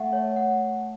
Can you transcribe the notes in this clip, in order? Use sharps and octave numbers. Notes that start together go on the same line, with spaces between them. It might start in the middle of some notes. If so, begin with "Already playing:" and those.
Already playing: A3 F#5
C#5
F#5